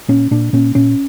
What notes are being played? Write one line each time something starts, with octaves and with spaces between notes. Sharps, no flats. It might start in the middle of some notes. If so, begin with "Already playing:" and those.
A#2 C#4
A#2 D4
A#2 C#4
A#2 C#4